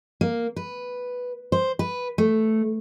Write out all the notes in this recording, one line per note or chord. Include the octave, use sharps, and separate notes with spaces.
A#3
B4
C5
B4
A3